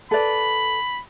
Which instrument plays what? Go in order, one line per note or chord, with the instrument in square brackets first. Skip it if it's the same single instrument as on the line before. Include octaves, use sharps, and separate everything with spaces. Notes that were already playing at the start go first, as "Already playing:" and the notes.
[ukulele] A4 B4 D5 [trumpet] B5